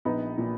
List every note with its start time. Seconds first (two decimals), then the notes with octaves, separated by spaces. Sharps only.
0.05 A#1 B3 D#4
0.38 A#2